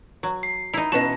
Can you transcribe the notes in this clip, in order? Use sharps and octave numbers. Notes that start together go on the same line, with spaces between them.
F#3
C7
D#4 E4 A#5
B2 E3 B3 C#4 F#4 D#5 A5